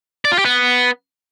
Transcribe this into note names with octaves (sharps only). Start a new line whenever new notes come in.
D5
F4
G4
B3